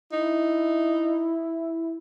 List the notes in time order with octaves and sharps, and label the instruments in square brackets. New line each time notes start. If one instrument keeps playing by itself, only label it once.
[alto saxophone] D#4 [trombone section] E4